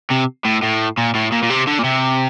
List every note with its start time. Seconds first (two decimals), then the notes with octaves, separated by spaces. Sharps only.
0.10 C3
0.45 A2
0.63 A2
0.97 A#2
1.15 A2
1.32 A#2
1.43 A#2
1.50 C3
1.67 D3
1.79 A#2
1.84 C3